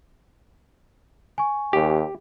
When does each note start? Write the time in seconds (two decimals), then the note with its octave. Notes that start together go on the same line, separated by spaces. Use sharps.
1.38 G#5 C#6
1.73 D#2 G4